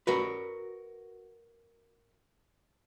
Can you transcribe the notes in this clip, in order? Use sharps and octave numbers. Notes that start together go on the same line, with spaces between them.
F#4 A#4 B4